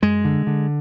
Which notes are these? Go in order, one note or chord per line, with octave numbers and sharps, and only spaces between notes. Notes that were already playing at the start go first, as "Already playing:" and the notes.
F#2 G#3
D3
D3